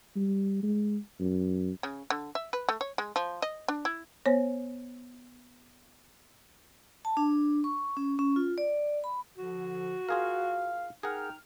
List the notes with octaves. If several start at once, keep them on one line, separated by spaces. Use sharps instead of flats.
G3
G#3
F#2
C#3
D3
E5
B4
A3
C#5
G#3
F3
D#5
D4
E4
B3 C5 C#5
A5
D4
C#6
C#4
C#4
F4
D5
B5
D3 F3 F#4
F4 G#4 A#4 F5
D#4 G#4 A#4 F#5 G5 F6